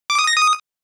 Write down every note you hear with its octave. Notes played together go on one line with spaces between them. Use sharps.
D6
D#6
A#6
D#6